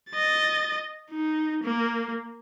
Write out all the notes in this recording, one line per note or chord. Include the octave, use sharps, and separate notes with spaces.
D#5 A6
D#4
A#3